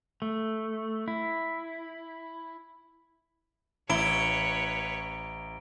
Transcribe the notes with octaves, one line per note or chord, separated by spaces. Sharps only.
A3
E4
A1 E4 B4 C#5 A#5 D7 G7